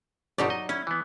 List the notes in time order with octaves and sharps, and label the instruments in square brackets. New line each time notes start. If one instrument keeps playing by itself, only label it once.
[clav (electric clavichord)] G1 B2 G4 [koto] F#3 D#4 D5
[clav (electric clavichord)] D#5
[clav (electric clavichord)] C#4 [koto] E4
[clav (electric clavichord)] E3 B3